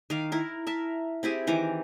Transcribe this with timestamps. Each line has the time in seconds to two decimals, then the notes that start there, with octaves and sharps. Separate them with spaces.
0.10 D#3 F5 D6
0.32 E4 A#4
0.67 A#4 E5 A5
1.23 C4 E4 G4 G#4
1.47 D#3 E3 A#5 D6